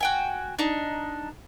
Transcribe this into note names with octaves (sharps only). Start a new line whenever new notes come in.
F#4 G5 G#5
D4 D#4